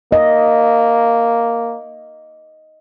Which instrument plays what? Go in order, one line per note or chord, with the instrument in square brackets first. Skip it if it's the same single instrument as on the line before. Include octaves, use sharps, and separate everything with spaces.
[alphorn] A#3 [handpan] D#5